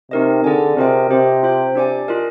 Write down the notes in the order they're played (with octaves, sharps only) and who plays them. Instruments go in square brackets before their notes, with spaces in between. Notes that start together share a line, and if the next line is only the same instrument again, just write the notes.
[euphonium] C3 [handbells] C4 D#4 A#4 D#5
[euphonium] D3 [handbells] G#4 D5 G#5
[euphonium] C3 [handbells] C4 F4 A#4 D#5 G5
[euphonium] C3 [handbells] G4 C5 D#5 G5
[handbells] F4 C5 G5
[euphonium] C3 [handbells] D4 G4 D5 G#5
[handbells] F4 A#4 D#5